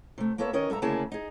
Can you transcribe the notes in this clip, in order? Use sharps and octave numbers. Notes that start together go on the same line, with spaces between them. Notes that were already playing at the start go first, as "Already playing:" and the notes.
C3 A3
A#3 B3 A4 C#5 E5
D#3 C#4 A#4 C#5 D#5
G2 A4 E5 A#5
D2 C#3 A#3 E4 G#4 A5
D#4 G#4